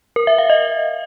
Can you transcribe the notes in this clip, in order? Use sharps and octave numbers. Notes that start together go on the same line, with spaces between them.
A#4
E5
F5
D#5